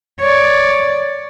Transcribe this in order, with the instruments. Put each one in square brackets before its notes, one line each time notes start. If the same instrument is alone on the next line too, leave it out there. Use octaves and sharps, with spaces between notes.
[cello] C#5 D5